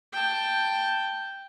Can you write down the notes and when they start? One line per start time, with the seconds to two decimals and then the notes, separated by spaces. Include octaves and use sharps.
0.13 G5 A5